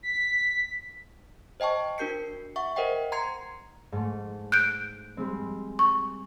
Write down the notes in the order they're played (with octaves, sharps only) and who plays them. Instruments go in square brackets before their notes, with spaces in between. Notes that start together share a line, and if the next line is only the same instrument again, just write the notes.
[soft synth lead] B6
[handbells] C5 D#5 G5 A5 C#6
D4 F#4 A#4 G6 C7 C#7
E5 F#5 C#6
A#4 C5 D#5 F#5 G5
A#5 C6 G#6 C7 C#7
[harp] G#2 A3
[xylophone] F#6 G6 D7
[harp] G3 G#3 C4
[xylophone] C#6